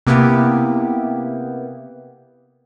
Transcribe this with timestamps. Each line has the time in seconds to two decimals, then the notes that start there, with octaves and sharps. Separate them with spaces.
0.07 C3 A#3 B3 E4 G4